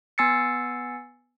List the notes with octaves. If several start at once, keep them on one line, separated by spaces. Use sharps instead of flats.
B3 G#5 E6 A6 C7 C#7